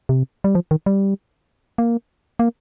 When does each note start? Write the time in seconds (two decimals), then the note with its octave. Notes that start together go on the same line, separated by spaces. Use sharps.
0.09 C3
0.44 G3
0.55 F3
0.71 D#3
0.86 G3
1.78 A#3
2.39 A#3